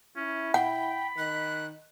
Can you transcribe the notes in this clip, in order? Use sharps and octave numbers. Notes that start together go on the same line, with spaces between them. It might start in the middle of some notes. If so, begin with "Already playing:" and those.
C#4 E4
F#5 G5 B5
D#3 F#6